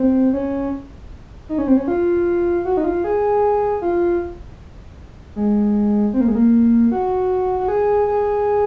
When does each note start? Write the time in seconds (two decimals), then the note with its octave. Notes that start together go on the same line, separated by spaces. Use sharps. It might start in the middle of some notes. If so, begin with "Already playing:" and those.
Already playing: C4
0.33 C#4
1.49 D#4
1.58 C#4
1.68 C4
1.77 C#4
1.88 F4
2.65 F#4
2.77 D#4
2.84 F4
3.04 G#4
3.82 F4
5.36 G#3
6.13 C4
6.21 A#3
6.28 G#3
6.35 A#3
6.92 F#4
7.59 F#4
7.68 G#4
8.07 G#4